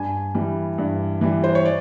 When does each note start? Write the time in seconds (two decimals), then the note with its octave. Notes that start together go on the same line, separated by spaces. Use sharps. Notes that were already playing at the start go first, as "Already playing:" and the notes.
Already playing: G2 G#5
0.35 E3 G3
0.78 G2
1.21 E3 G3
1.44 C5
1.55 C#5
1.65 D5